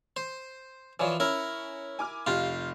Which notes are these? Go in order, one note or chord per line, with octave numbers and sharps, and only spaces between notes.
C5
E3 F3 C#5 D5 G#5
C#4 E4 A#4
G#5 D6 F6
F1 F4 G4 F5